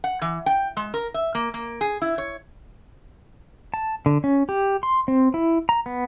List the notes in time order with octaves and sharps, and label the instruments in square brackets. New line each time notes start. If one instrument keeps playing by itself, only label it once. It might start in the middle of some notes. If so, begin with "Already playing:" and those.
[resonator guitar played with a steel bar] F#5
E3
G5
G#3
A#4
E5
A#3
A#3
G#4
E4
C#5
[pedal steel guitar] A5
D3
C#4
G4
C6
C4
E4
A#5
B3